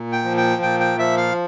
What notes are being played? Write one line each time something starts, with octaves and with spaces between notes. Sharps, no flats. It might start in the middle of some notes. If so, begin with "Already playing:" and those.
Already playing: A#2
G5
F3
G5
A#2 G5
G5
F3 E5
F5